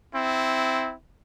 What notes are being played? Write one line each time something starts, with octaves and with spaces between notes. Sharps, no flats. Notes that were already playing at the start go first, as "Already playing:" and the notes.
C4 E4